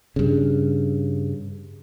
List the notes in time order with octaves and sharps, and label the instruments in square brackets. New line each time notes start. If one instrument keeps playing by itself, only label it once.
[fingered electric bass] G2 C#3